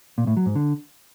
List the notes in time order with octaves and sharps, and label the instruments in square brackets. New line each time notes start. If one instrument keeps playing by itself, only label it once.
[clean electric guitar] A#2
A2
F#3
G#2
D3